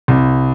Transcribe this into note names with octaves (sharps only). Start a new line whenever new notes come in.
C2